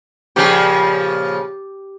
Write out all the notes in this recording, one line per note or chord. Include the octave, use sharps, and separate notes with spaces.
A#2 C#3 F3 G4